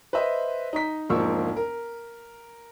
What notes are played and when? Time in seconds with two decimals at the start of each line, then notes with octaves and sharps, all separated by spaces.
0.13 B4 C5 D#5 E5
0.73 D#4 A#5 B6
1.10 E1 G#2 F3 A#3 C#6 E6
1.56 A#4